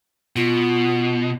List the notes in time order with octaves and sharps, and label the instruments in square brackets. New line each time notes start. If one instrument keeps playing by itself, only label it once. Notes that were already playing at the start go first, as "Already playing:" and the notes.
[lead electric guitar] B2 [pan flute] F4